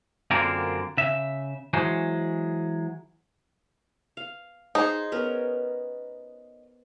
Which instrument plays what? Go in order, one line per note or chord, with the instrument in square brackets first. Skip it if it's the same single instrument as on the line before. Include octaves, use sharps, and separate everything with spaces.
[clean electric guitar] F#2 D3 A#3 C4 F4 A#4
C#3 E5
E3 F#3 G#3 C5
[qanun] F5
[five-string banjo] D#4 [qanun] G#4 C5
[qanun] B3 C#4 A#4